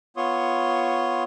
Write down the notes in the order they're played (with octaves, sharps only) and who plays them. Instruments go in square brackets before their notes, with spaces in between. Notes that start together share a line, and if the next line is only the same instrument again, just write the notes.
[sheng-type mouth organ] B3 F4 C#5 C6 C#6 D#6